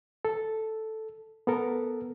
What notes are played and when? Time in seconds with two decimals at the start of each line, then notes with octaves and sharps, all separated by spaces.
0.25 A4
1.47 B3 A4 A#4